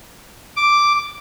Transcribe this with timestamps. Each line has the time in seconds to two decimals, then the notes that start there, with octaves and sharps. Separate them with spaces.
0.56 D6